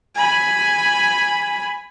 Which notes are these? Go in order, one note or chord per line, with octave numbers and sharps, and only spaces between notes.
G#5 B5